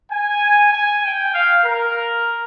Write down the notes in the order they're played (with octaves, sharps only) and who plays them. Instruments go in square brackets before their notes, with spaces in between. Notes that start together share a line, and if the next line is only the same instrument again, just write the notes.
[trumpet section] G#5
G#5
G5
F5
A#4